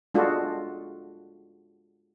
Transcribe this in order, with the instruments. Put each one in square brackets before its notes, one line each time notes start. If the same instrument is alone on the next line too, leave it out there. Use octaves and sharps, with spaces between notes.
[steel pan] G#3 D4 F4 F#4 A4